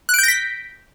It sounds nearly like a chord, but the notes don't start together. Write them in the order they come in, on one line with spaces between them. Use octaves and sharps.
F#6 D7 G6 A#6 B6